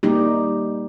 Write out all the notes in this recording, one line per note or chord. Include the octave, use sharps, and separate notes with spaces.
G3 A#3 D#4 G4